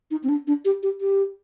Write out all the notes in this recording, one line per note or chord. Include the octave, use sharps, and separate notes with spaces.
D#4
C4
D4
D4
G4
G4
G4